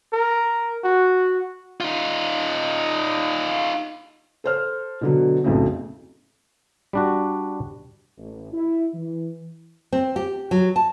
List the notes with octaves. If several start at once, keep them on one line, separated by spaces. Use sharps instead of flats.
A#4
F#4
D#4 F4
A4 C5 F6
B2 D3 F#3
B1 F2 A2 C#3
G3 D4 F#4
A1
E4
E3
C4
G4
F#3
A5